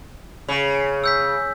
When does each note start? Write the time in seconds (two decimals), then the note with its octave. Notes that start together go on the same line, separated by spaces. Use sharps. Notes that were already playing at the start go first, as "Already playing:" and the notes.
0.49 C#3
1.04 E6 G6 B6